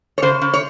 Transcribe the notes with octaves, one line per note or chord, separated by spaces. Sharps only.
C#5
C#3 C5
C#3
C#5